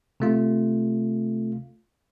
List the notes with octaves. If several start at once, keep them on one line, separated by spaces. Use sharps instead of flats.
C3 A3 F4